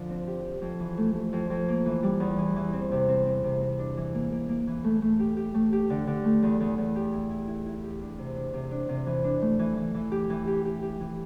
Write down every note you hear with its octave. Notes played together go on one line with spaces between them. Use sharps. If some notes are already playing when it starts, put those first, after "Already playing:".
Already playing: D3 F3
C4
G4
G4
F2
E3
A3
A3
F2
F2
A#3
E3
G3
E2
E3
E3
C4
C3
C4
C4
C3
C4
D4
E3
A#3
A#3
A#3
E3
A3
A3
G4
G4
A3
G4
D3
D3
A3
E2
E2
E2
G4
E4
E4
E4
E4
G4
D4
C3
D4
C3
D4
C3
E3
D4
A3
E3
E3
E3
G4
E3
G4
G4
G4
E3